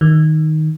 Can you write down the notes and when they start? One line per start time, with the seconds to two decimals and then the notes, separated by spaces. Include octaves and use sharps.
0.01 D#3